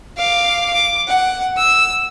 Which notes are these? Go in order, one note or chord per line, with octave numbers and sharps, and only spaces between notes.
F5 D6
D6
F#5
E6